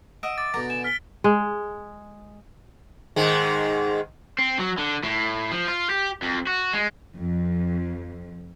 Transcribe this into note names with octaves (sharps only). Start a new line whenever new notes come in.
D#5 E5 F#5 D7
D6 A6
B2 D3 A#5
G#5 E7
F6 B6 G7
G#3
G#2 D#3 G#3
C4
F#3
D3
A2
F3
F4
G4
F2
F#4
G#3
F2